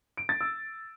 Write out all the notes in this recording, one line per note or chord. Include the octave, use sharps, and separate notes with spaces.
D7
A6
E6